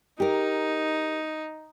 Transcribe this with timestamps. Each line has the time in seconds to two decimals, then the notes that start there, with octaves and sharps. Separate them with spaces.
0.20 D#4 G4 A#4